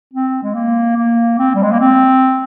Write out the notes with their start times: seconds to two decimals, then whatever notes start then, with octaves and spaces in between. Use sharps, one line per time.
0.14 C4
0.43 G#3
0.54 A#3
0.96 A#3
1.39 C4
1.55 G3
1.63 G#3
1.71 A#3
1.81 C4